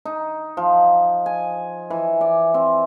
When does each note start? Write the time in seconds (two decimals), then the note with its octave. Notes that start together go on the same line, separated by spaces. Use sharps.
0.05 D#4
0.57 F3
1.26 G#5
1.90 E3
2.21 D5
2.54 C4